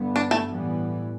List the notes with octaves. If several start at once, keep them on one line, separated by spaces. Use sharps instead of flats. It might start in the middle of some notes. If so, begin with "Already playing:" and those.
Already playing: G2 D3 B3
D4
A3
A2 E3 G3 B3